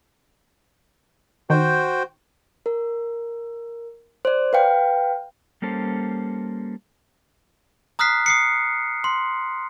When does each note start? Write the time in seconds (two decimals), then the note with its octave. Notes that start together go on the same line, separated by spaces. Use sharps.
1.50 D#3 F#4 C5 G5
2.66 A#4
4.25 C5 D5
4.53 B4 F5 G5
5.62 G3 A#3 C#4 A4 C5
7.99 A#5 D#6 F6 F#6 B6 C7
8.26 D#6 C7 C#7
9.04 C6